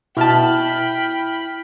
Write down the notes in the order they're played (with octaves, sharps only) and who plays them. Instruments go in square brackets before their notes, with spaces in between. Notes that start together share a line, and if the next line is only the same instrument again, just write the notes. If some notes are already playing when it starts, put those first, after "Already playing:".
[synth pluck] B2 A5 [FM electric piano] E4 F6 [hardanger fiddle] G5 B5